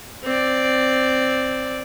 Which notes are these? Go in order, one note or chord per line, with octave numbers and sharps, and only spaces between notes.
C4 D5